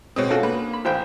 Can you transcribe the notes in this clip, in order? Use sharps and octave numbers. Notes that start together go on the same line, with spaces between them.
B2 G#3 C4 C#5 D#6
C#4 D4 F4 F#4 A4
A#3 B4
B5
A1 F#4 C5 F5 G5 G#5